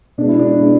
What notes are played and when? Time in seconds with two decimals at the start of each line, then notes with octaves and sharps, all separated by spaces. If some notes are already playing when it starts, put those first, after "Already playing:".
0.18 B2 G#3 D4
0.28 E4
0.39 D4
0.60 B2 G#3